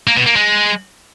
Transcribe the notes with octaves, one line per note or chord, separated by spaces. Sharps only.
A#3
B2
A#3
G#3